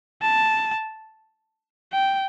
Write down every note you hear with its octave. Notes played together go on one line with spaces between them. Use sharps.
A5
G5